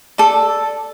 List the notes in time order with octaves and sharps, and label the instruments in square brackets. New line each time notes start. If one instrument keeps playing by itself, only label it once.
[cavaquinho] A4 D5